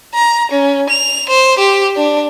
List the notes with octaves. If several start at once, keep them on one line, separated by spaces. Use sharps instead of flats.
A#5
C#4
F7
C5
G4
D4